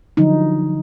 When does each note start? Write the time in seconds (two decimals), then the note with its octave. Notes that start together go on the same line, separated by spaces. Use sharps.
0.17 D3 F3 F#3 D#4